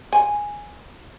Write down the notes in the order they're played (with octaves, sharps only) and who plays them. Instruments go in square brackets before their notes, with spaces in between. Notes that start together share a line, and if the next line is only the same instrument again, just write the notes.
[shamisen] G#5